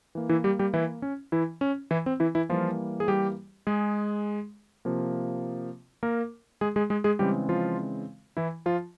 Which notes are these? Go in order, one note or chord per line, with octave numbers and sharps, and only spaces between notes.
E3 A#3
E3 E4
G3 G4
G3 G4
E3 E4
C#4
E3 E4
C#4
E3 E4
C4
E3 E4
E3 E4
E3 F3 G3 A#3 F4
G#4
G3 G4
G#3 G#4
C3 F3 A#3
A#3 A#4
G#3 G#4
G#3 G#4
G#3 G#4
G#3 G#4
C#3 E3 G3 G#3 C4 G4
F3 F4
E3 E4
F3 F4